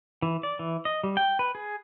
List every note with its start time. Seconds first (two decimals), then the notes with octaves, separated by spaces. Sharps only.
0.22 E3
0.43 D5
0.59 E3
0.85 D#5
1.04 G3
1.17 G5
1.39 B4
1.55 G#4